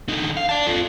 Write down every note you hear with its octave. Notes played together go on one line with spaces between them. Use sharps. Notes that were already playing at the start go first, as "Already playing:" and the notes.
D3 D#4
F5
D5 A5
F4 A4